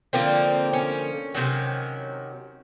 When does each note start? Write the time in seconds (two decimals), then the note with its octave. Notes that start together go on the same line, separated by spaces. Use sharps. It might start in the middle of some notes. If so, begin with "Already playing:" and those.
0.13 D3 F3 A#3 C4
0.73 C#4
1.35 C3 D#3 F#3